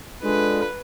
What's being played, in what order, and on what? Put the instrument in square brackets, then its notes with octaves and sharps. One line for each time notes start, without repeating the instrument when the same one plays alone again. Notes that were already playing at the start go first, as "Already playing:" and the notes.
[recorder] G#3 [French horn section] D4 F4 A4 [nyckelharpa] B4